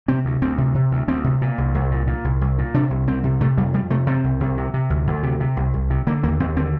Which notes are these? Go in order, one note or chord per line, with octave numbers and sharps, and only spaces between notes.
C3 C4
D2
D2 C4
C3
C3
D2
D2 C4
C3
A#2
C2
C2
A#2
A#2
C2
C2
A#2
C3 D4
C2
C2 C4
C3
C3 A3
F2 G3
F2 G3
C3 A3
C3 C4
C2
C2
C3
C3
D2
D2
C3
C3
C2
C2
C3
D3 A#3
D#2 A#3
D#2 C4
D3 C4